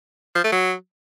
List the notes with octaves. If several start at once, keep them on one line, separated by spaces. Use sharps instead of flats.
F3
A3
F#3